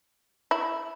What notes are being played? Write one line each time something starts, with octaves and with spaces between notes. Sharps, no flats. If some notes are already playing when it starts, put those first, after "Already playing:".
E4